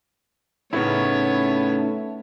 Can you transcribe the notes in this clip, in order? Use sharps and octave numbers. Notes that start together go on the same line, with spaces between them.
A2 C#3 A3 B3 C#4 D#4 E4 C#5